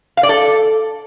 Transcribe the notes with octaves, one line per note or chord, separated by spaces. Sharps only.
F5
D5
A4